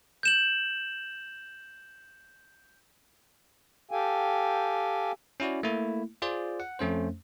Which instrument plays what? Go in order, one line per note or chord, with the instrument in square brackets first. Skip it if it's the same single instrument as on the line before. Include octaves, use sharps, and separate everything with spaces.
[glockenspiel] G6 E7 F#7
[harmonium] G4 A4 F5 G5 G#5
[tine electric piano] C#4 E4 F#4 D5
A3 A#3 E4
F4 G#4 C5 D5
F#5
F2 A3 C#4 C5